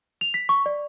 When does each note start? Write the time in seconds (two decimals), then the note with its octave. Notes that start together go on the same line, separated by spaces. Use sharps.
0.21 F7
0.34 B6
0.49 C#6
0.66 D5